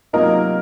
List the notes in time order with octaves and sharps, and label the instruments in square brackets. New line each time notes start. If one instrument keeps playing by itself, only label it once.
[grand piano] C3 F#3 A#3 F4 A#4 [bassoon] D#4